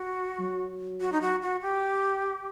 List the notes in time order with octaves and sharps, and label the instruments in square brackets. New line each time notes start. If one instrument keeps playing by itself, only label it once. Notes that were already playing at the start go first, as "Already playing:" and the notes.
Already playing: [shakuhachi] F#4
[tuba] F#3
[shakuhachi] F#4
D#4
F#4
F#4
G4